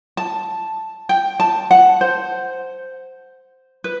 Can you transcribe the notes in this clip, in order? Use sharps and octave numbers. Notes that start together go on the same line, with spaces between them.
A5
G5
A5
F#5
C5
B4